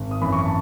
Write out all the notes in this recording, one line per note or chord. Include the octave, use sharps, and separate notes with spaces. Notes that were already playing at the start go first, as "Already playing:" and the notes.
Already playing: G#1
D#6
F#2 E3 B5
C#6
A5